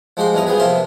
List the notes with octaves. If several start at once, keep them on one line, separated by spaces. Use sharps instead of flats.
F3 G#3 F#4 G4 C6
E2 F3 G3 E4 A#5 D#6
B3 C4 G#4 B4
C3 F3 A#3 E5 C6